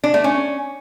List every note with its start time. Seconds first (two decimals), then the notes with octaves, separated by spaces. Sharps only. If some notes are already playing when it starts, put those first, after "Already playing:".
0.04 D4
0.14 A3
0.24 C#4